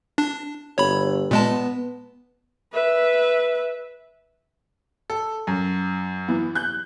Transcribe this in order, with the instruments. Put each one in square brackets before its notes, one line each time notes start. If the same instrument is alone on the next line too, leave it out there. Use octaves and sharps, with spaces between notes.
[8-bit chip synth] D4
[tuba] G1 [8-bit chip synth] C#5 B5
[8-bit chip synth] A#2 G#3 A5 [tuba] B3
[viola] B4 E5
[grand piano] A4
F#2
[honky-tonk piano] E3 B3
F#6 G6